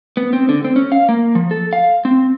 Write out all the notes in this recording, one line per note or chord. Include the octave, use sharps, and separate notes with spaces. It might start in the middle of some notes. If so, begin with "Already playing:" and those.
B3
C4
D3
C4
C#4
F5
A#3
F3
A4
F5
C4